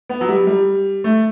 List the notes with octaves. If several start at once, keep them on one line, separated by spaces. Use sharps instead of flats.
B3
F#3
G3
G3
A3